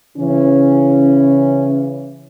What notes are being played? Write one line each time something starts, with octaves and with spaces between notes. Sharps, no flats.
C#3 E3 C#4